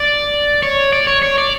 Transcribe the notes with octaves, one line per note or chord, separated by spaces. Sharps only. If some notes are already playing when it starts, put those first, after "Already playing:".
Already playing: D5
C#5
D5
C#5
C#5
D5